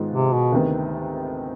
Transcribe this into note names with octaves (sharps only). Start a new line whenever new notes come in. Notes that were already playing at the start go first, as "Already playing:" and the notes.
Already playing: G#2 D#3 G#3 B3 F4
C3
B2
D2 C3 D#3 B3